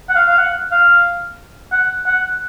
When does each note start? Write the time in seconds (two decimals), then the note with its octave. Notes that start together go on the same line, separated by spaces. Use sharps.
0.09 F#5
0.15 F5
0.28 F5
0.38 F#5
0.72 F5
1.72 F#5
2.07 F#5